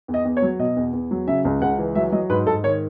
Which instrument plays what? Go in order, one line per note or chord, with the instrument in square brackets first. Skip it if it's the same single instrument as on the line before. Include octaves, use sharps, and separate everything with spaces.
[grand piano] E2
D#5
E2
C#5
F#3
B2 D#5
E2
E2
F#3
C#3 E5
C#2
C#2 F#5
E3
F#3 E5
F#3 D#5
G#2 B4
G#2 A4
D#3 C#5